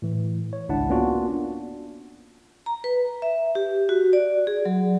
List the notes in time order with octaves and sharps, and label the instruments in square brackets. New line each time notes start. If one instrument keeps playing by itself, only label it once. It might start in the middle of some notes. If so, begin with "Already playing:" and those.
[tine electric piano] A2 E3
C#5
G#1 C#2 D4 E4 F#5 A5
A#3 B3 C#4 D4 F4 F#4
[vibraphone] A#5
B4
E5
G4
F#4
D5
G#4
F#3